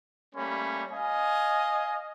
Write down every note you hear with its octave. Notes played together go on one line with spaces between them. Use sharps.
G3 A3 A#3 C#4 B5
D#5 F5 G#5